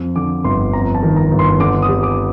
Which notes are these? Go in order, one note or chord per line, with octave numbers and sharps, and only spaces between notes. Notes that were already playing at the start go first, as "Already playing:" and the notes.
Already playing: F2
D3 D6
G1 C6
F2 A#5
A5
D#3
A#5
G1
C6
D3 D6
D#6
G3
D6